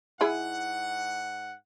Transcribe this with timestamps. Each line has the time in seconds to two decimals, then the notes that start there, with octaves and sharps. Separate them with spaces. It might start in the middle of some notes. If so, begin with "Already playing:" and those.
0.21 G#2 E4 G#4 F#5 B5